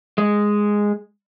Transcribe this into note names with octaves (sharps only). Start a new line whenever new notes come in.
G#3